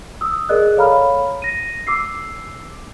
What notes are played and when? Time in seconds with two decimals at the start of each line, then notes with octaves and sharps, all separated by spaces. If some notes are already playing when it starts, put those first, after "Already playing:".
0.21 D#6 E6
0.49 G#4 A#4 D5 D#5 F#6
0.77 A4 C#5 F5 A#5 B5 F6
1.42 A#6 D#7
1.87 D6 E6 C7